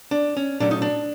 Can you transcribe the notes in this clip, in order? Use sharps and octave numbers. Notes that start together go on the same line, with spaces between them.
D4
C#4
A#2 F#3 A3 C#4 D4
D#4
D4